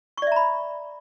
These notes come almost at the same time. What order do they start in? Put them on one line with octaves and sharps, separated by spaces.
C#6 D5 E5 A#5 B5